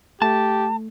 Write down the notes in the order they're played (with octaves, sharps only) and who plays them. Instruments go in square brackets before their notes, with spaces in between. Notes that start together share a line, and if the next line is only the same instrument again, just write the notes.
[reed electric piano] A3 [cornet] G4 [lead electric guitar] A5